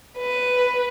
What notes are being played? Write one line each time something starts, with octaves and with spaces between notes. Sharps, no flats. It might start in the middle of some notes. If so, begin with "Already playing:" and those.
B4